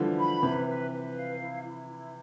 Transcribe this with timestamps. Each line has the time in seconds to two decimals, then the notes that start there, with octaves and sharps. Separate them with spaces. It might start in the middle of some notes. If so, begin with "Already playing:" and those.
Already playing: D3 E3 F3 G3
0.18 B5
0.42 C3 E3 B4
0.67 B4
0.92 B4
1.16 F5
1.40 E4
1.66 E4
1.90 E4